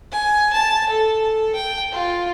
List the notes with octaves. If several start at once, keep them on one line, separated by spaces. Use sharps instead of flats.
G#5
A5
A4
G5
F4